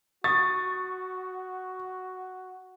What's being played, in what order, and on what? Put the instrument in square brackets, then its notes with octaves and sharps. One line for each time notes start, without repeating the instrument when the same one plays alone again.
[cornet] F#4 [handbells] C#6 D#6 [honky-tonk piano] A6